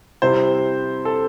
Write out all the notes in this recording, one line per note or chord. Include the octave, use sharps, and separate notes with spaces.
C3 G3 C4 E4 C5
A4